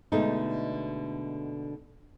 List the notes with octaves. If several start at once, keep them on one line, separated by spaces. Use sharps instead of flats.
B2 D3 G#3 A3 D#4